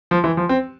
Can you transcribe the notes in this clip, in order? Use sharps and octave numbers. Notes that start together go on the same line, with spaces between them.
F3
E3
F3
C4